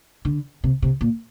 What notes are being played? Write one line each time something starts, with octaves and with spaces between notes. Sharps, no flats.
D3
C3
C3
A#2